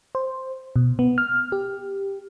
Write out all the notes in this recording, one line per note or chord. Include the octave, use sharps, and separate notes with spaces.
C5
B2
B3
F6
G4